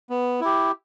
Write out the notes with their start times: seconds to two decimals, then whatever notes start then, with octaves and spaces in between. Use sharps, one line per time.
0.10 B3
0.40 E4 G4